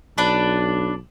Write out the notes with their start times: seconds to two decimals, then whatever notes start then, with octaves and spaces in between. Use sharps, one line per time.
0.18 B1 D4 B4